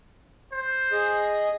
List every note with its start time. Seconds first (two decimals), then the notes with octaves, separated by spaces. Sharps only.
0.52 C5
0.92 G#4 D#5